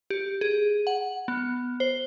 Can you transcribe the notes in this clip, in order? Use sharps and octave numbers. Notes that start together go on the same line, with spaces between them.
G4
G#4
F#5
B3
C5